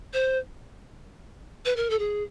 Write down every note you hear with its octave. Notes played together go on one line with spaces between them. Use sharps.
C5
B4
A#4
A4
G#4